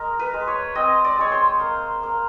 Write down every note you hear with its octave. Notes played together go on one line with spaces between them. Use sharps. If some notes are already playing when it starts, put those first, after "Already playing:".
Already playing: G#3 A#4
B4
G#3
C#5
C4 D#5
D5
G#3 C#5
C5
A#3
A#3